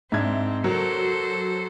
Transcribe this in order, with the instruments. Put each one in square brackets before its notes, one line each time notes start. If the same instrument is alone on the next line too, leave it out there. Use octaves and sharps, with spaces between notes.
[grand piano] G#2 D4 G#6 [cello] C4 [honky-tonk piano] E5
[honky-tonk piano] F#3 [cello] A4 C5 [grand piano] A#4